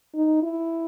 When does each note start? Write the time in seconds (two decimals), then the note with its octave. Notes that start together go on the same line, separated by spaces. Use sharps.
0.15 D#4
0.42 E4